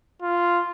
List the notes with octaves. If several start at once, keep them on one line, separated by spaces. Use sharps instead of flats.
F4